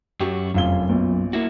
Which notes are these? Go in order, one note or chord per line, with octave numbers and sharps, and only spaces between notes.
F#2 F#3 F#4 G4
F1 F#2 F4 G7
B1 A#2
A#3 E4 F#4